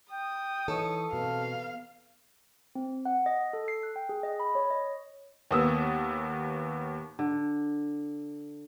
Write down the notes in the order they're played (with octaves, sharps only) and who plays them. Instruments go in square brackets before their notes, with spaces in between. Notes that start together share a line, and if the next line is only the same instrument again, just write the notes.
[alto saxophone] G5 [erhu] D#6
[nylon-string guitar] E3 D#4 [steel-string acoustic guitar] A4 [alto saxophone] C#5
[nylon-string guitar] B2 [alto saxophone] C4 [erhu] F5
[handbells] C4
F#5
D#5
A4
C7
F#6
G5
G#4
D#5
B5
C#5
D#5
[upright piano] D#2 A#3 B3 D#6 E6
[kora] D3